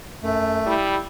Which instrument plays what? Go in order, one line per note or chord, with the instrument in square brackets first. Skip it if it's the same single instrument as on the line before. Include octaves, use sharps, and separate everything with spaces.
[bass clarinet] F#2 [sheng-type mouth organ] A3
[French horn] G3 [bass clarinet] E4